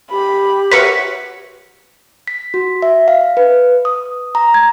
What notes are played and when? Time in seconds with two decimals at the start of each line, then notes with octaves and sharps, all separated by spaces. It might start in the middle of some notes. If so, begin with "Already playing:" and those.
0.11 G4 B5
0.72 F#4 A#4 B4 C#5 E5 B6 C#7
2.28 B6
2.54 F#4
2.82 E5
3.08 F5
3.37 B4
3.85 D#6
4.35 A#5
4.54 G#6